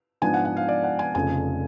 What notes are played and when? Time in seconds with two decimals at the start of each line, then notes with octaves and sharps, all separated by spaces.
0.22 G#2 F3 B3 D4 G#5
0.34 F#5
0.45 F#5
0.57 F5
0.68 D5
0.84 F#5
0.99 G#5
1.14 F1 F2 C#3 G#5